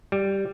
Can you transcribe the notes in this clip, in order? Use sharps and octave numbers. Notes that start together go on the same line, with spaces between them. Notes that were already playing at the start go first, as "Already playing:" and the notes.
G3